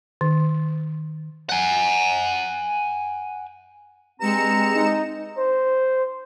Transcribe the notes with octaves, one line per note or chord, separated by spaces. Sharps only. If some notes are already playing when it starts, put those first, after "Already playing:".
D#3
F#5 G#5
G2 G#3 C4 A#5 C#7 E7
D#4
C5